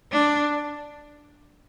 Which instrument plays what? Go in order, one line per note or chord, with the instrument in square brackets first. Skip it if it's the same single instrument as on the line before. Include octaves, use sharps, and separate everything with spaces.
[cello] D4